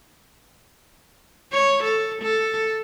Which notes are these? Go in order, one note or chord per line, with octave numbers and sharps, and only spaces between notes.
C#5
A4
A4